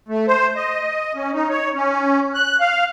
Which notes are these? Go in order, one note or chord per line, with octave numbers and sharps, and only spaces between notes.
A3
C5
D#5
C#4
D#4
C#5
C#4
F#6
F5